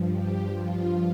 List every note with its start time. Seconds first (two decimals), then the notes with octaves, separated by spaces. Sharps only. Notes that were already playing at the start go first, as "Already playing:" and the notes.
Already playing: G2 F3
0.10 G4
0.50 G2 F3 F4